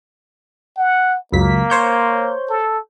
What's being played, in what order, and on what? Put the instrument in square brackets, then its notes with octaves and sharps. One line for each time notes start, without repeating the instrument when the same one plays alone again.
[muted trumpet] F#5
[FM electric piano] C#2 F#2 B6 [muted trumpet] A#3
[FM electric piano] C5 C#5 G6
[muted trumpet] A4